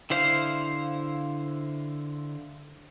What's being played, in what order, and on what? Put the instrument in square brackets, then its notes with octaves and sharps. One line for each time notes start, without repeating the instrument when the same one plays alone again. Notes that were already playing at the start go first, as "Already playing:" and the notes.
[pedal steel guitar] D3 E4 C5 F5